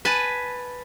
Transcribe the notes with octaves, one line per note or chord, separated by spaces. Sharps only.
B4 G#5 A5